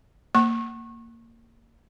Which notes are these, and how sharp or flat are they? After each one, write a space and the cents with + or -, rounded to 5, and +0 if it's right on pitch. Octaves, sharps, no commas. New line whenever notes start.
A#3 -20 C#6 -25